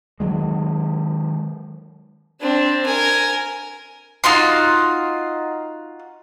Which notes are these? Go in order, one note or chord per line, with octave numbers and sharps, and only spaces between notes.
D#3 F#3 G#3
C4 D4
A#4 G#5
D#4 F4 F#4 C6